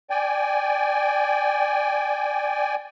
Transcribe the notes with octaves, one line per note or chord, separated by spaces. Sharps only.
D5 G5 G#5